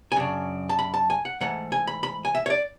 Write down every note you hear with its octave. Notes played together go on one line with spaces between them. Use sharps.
G#5
F#2 C#3 D4
A5
B5
A5
G#5
F#5
G#2 E3 A3 F#5
G#5
B5
B5
G#5
E5
C#5
D5